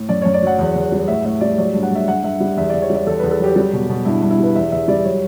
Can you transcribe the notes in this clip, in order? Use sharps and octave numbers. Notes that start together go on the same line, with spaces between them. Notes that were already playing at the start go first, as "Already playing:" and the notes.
Already playing: A2
F#2 D5
F#2 C#5
D5
F#3 F#5
E2
E2
G3
A2 E5
A2 E5
G3 D5
F#3 D5
G2
F#5
G2 E5
G2 F#5
G2 E5
G3
E2 E5
E2 D5
C#5
G3 D5
E2 A4
E2 B4
A4
F#3 G4
G3
B2
B2
G2 E4
G2
E4
G3 B4
E2 E5
E2 E5
G3 D5
F#3 C#5